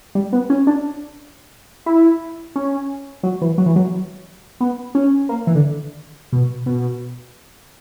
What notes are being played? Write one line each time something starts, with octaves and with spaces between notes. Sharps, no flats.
G3
B3
C#4
D4
E4
C#4
F#3
E3
F#3
E3
F#3
B3
C#4
A#3
E3
D3
B2
B2